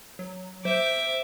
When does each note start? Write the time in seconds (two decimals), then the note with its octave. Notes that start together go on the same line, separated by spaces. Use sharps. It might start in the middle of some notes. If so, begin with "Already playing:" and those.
0.19 F#3
0.65 C5 E5 D6